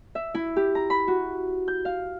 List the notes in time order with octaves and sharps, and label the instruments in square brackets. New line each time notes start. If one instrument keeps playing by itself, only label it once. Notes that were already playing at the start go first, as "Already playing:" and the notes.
[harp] E5
E4
G4
A#5
B5
F#4
G6
F5